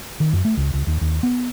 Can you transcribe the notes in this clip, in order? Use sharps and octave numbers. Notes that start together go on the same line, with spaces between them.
D#3
F#2
A3
C#2
C#2
D#2
D#2
B3